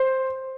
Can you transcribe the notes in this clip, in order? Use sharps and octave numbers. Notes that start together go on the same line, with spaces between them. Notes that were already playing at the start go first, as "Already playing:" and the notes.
Already playing: C5